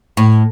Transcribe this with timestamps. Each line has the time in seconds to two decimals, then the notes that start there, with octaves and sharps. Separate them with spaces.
0.17 A2